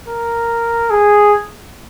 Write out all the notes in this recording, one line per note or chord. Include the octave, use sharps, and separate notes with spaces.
A#4
G#4